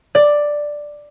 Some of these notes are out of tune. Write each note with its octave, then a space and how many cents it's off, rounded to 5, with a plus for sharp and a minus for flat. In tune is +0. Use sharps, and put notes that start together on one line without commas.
D5 +5